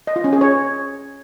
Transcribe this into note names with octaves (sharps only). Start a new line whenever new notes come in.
D#5
F4
C#4
G#4
C#5